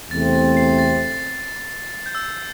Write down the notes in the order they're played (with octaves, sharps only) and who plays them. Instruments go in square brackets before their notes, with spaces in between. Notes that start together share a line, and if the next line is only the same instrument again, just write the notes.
[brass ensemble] E2 C3 A3 C4 [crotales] A6
[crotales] A6
C7
A6
G6
E6